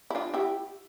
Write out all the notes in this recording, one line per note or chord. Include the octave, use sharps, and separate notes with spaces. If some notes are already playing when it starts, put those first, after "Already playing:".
E4
D4 F4
E4 G4